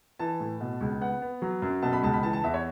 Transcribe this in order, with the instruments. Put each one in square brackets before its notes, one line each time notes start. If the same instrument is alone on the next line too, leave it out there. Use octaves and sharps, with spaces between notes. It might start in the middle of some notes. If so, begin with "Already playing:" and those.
[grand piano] E3 A5
A2
B2
C#2
B3 F#5
B3
F#3
F#2
B2 A5
B5
C#2 A5
B5
E3 A5
A5
E2 E5
C#5